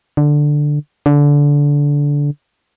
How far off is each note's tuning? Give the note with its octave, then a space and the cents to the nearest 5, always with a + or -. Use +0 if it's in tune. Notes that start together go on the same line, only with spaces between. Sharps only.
D3 +5
D3 -20